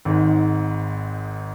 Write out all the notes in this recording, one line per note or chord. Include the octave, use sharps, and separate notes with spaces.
G#1 G#2 D#3